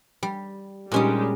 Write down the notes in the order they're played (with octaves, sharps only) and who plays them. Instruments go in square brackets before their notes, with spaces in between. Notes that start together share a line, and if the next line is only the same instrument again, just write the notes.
[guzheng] G3
[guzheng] A#2 C#4 D#4 [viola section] G3 G#3 G4